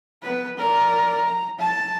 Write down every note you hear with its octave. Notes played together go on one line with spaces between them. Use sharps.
B3 B4
A#4 D5
A#5
A5